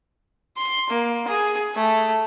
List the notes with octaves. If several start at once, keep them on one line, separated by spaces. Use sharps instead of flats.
C6
A#3
G#4
A3